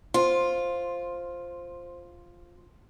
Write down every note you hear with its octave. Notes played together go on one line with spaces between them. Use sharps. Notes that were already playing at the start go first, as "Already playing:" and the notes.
F4 C5 C6